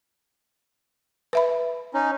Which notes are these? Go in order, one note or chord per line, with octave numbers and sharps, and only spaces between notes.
B4 E5 B5
C#4 D#4